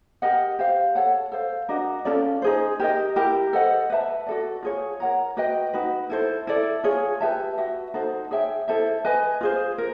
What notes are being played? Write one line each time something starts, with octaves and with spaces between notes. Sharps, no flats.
G4 A#4 D#5 F#5
G4 C5 F5
A4 C#5 F#5 A5
A4 C5 F5
D4 F#4 A#4 D#5
C#4 F4 A4 D5
D#4 G#4 C5
G4 A#4 D#5
E4 G4 A#4
A4 C5 D#5 F#5
B4 E5 A5
F#4 A4 D5
F4 G#4 C#5
A#4 C#5 F#5 A#5
F#4 B4 D#5 G5
D#4 F#4 B4
E4 A4 C5
E4 A4 D5
F4 G#4 C#5
G4 B4 E5 A5
F#4 B4 E5
D#4 F#4 A4 C5
G#4 C#5 E5 G5
E4 A4 C5 E5
B4 D#5 G#5
F4 G#4 C5
A#4